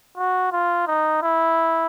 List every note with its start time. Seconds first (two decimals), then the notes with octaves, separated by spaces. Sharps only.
0.17 F#4
0.52 F4
0.87 D#4
1.22 E4